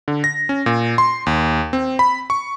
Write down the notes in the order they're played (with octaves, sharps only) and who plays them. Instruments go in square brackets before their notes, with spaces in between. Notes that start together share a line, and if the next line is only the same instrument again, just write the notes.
[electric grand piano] D3
A#6
C#4
A#2
C6
D#2
C4
B5
C#6